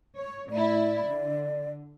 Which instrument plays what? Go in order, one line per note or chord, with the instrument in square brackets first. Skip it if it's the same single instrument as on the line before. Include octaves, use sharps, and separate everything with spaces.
[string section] C#5
[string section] A2 E4 [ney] D5
[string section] D3